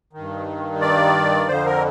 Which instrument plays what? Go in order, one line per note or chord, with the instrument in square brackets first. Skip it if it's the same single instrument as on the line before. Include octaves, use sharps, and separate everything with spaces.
[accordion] G2 D#3
D5
F2 D3 F3 C5
A#4